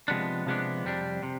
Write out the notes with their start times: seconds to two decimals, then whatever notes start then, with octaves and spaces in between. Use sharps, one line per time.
0.08 C3 F3 G#3 B3 D4
0.46 C3 F3 G#3 B3 D4
0.85 F2 C3 G3 D4
1.23 C3